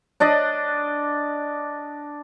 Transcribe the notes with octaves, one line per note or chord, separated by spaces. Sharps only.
D4 D5 D#5